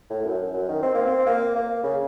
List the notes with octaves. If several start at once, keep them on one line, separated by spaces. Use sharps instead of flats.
A2
F#2
F#2
D#3
C4
A#3
C4
A#3
A#3
C#3